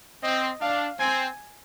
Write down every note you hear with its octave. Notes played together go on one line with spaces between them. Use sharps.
C4 D#5
D4 F5
C4 G#5